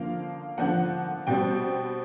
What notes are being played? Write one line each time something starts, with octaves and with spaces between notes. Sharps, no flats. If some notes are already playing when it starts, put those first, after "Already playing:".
Already playing: D3 F3 A#3 F5
D3 F3 A#3 F#5
B2 G3 C4 G5